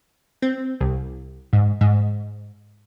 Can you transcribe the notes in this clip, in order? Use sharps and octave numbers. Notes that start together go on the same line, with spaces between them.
C4
C2
G#2
G#2